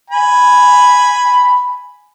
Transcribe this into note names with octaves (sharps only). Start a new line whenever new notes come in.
G#5 B5